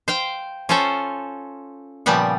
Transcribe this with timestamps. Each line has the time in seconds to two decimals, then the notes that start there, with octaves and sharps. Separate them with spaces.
0.08 C5 F5 G5
0.69 C#4 F4 A4 C5 C#5
2.06 A#2 C#3 F3 G3 B3 F#5